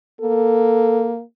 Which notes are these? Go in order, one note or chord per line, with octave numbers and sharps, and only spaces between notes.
A#3 A4